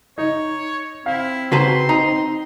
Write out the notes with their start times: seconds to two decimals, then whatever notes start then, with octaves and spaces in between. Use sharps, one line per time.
0.18 D#4 C#5
1.06 C4 E4 F5
1.52 C#3 F#4 B4 C5 A5 A#5 C6
1.89 D#4 A#5